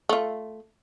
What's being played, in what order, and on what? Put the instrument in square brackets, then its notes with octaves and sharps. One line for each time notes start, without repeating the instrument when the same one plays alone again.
[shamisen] A3 F4